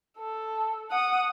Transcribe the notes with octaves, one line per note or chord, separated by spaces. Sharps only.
A4
F#5 D#6